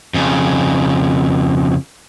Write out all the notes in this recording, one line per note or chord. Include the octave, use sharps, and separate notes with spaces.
F2 C#3